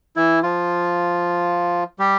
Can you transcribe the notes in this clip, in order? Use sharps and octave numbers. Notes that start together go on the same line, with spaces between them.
E3 E4
F3 F4
G3 G4